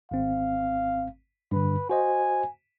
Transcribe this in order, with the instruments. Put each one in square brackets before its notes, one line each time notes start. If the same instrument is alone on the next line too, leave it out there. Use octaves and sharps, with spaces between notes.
[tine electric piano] G#1 C4 [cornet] F5
[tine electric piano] G2 D3 [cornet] B4
[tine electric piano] F#4 C5 D#5 [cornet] G#5